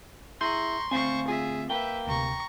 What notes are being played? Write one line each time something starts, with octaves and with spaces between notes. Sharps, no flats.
E4 G#4 A#5 C6 C#6 G6
D2 C4 C5 F5 G#5 C#6
F4 G#4 E5
A#3 B4 E5 G5
D2 C3 A#5 C#6